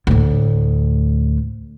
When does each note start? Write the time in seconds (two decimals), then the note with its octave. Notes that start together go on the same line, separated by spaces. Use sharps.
0.07 D2 A2